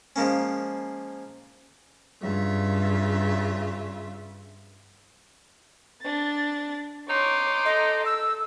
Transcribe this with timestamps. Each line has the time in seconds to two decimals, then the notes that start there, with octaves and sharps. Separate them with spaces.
0.16 F3 G#3 A#3 C#4
2.21 G2 C#3 F4 E5
6.02 D4 A6
7.10 D#4 C#5 C6 D6
7.65 A4 D#5
8.06 E6